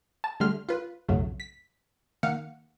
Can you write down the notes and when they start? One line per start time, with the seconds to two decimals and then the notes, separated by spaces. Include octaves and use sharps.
0.24 A5
0.40 D3 G3 A3 C6 F6
0.69 F4 B4
1.08 B1 F2 G#2 C#3 F#3 A3
1.40 B6
2.23 D#3 A#3 F5 F#5 C#7